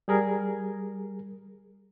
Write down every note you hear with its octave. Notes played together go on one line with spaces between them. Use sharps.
G3 G#4 A#4